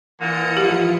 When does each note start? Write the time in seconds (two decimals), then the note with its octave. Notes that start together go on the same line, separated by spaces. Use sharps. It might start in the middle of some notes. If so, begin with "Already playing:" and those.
0.19 A#2 D3 E3 A#3 D#6 C#7
0.57 F3 E4 F4 G4